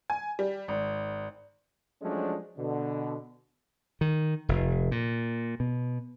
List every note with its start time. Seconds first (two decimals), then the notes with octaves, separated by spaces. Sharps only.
0.10 G#5
0.39 G3
0.68 G#1
2.02 F3 F#3 G#3 A3 C#4 D4
2.58 B2 D3
4.01 D#3
4.49 F1
4.91 A#2
5.60 B2